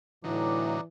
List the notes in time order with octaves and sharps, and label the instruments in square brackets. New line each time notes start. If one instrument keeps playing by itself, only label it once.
[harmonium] A2 [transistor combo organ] D3 F#3 D#4 [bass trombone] E3 [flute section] D5 A#5 D6